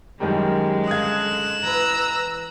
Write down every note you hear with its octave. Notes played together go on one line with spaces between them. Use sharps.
F#2 D#3 G3 G#3
F#2 D3 F5 D#6 F#6 G#6 E7
E3 B4 A#5 E6